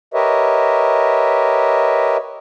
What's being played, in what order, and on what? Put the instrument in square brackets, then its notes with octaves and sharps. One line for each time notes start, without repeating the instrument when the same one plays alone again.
[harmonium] G4 A#4 B4 C#5 D#5 E5